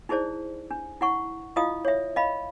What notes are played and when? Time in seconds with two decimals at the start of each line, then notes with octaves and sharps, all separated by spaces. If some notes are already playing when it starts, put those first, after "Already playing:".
0.09 D#4 E4 G#4 C5 D5
0.71 D4
1.01 E4 F#5 C#6
1.56 E4 F4 D#5 F5 D#6
1.85 C#5 E5
2.16 D#5 F5 B5